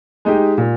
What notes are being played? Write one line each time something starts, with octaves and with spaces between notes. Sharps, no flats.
G#3 D#4 G4
A#2